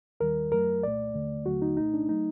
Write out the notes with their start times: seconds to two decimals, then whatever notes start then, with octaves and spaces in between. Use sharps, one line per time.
0.20 D#2 D#3 G3 A#4
0.51 F#2 F#3 A3 A#4
0.83 C2 A#2 A3 D5
1.14 D#2 D3 A3
1.46 D#2 D3 F#3 A3 F#4
1.62 D#4
1.77 C2 A#2 A3 D#4
1.94 D4
2.09 F#3 A3 D#4